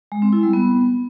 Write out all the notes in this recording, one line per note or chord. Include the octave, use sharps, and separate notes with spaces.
G#3
C4
E4
G3
B3